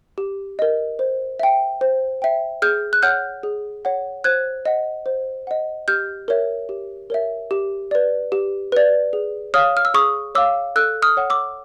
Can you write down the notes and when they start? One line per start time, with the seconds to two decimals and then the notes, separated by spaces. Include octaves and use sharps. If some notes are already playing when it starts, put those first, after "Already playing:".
0.18 G4
0.59 A#4 D#5
0.99 C5
1.40 E5 G5
1.81 C5
2.22 E5 G5
2.62 G#4 F6 G6
2.93 F#6
3.03 C#5 F#5 F6 G6
3.43 G#4
3.85 C#5 F#5
4.24 C5 F#6 G#6
4.65 D#5 F#5
5.06 C5
5.47 D#5 F#5
5.88 G4 F6 G6
6.28 A#4 C#5 E5
6.69 G4
7.10 A#4 C#5 E5
7.51 G4
7.91 B4 D5
8.32 G4
8.72 B4 D5
9.13 G#4
9.54 C#5 F5 D#6 F6
9.77 F6
9.85 E6
9.94 G#4 C#6 D#6
10.35 C#5 F5 D6 E6
10.76 A4 E6 F#6
11.02 D#6 F6
11.17 C#5 F#5
11.30 D6 E6